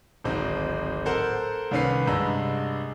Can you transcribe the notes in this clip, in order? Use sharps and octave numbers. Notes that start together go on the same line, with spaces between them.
D1 G#1 C4 D#4
A4 A#4 C5 F#5
C2 D#3 C#4 B4 C7
C2 G2 G#3 A#5 E6